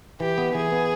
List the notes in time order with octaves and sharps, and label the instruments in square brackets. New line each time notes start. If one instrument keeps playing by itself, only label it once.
[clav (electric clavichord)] E3 [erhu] G4
[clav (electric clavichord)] B3
[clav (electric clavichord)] E3 [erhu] G#4
[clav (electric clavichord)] B3